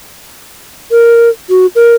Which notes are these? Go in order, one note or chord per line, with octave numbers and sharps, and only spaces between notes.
A#4
F#4
A#4